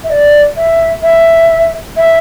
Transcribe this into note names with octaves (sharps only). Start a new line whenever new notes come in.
E5
D5
E5
E5
E5